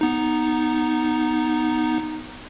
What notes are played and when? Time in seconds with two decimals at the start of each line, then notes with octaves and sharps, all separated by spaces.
0.01 B3 D#4